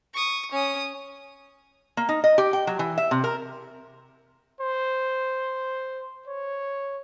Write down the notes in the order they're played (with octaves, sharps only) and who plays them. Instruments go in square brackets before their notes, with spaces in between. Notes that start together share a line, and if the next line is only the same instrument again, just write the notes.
[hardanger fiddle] C#6 D#6
C#4 D#6
[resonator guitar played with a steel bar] A#3
D#4
D#5
G4
G5
F#3
E3
E5
C3
A#4
[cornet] C5
C#5